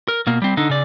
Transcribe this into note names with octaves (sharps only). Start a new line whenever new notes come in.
A#4
B2 A#3
G3 C4
D3 D#4
C#3 D5